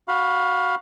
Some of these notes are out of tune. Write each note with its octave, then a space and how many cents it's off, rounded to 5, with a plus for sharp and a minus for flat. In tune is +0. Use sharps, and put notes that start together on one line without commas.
F#4 +0 F5 +20 B5 -5